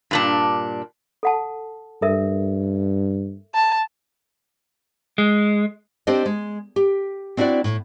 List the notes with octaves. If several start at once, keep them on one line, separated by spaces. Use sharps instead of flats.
G2 A#2 D4
A4 F#5 A5
G2 A4 A#4 E5
A5
G#3
C4 D4 G4 C5 D#5
G#3
G4
C4 D4 E4 F#4 D5
A2